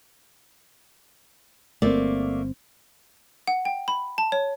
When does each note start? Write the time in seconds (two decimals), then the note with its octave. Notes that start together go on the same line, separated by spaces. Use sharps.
1.82 G1 B2 A3 A#3 C4 D5
3.48 F#5
3.65 G5
3.88 B5
4.18 A5
4.32 C#5